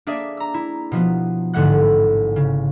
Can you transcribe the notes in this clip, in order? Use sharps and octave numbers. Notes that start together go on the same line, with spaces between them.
A#3 D4 G#4 D5 E5
A#5 E6
E4
B2 F3 B3
A1 G#2 D3 A3 F#5 F#6
C#3